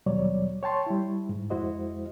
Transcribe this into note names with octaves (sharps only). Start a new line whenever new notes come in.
D#2 B2 F#3 G3 C#5 D5
C#5 G5 A5 C6 C#6
G3 E4
G#2
F2 G#3 E4 F#4 C5 D#5